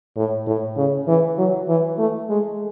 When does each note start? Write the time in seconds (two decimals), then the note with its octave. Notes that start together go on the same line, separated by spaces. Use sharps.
0.17 A2
0.47 A2
0.77 C#3
1.08 E3
1.38 F#3
1.68 E3
1.99 A3
2.30 G#3